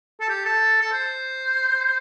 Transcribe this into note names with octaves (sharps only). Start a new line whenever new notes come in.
A4
G4
A4
A4
C5